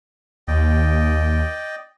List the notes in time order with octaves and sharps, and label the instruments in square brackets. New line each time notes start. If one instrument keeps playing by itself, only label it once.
[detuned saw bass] D#2 [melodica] D5 D#5 G5